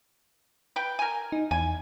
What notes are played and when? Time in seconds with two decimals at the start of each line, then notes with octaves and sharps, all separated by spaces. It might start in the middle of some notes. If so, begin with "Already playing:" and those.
0.76 B4 G5
0.99 A#4 G#5
1.32 D#4
1.51 E2 G#5